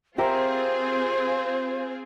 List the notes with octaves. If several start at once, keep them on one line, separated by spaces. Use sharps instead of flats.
C4 F4 G4 G#4 A#4 C5 E5